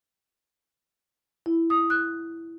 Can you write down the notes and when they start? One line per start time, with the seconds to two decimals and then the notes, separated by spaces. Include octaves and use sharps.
1.46 E4
1.70 D#6
1.90 F#6